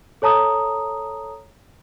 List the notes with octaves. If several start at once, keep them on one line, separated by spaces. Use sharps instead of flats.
A4 C#5 A5 A#5 D#6